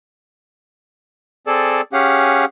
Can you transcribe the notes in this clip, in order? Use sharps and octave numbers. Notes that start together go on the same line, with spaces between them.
C4 G#4 A4 D5 E6
C#4 G4 G#4 F5 F#5